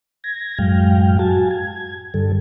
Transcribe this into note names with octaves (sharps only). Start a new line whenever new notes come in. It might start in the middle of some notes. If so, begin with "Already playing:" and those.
G#6 A#6
F#2 A2 F#3 G#3 F5 G5
F#4 G#5 A5
G#6
G2 D3 G3 A4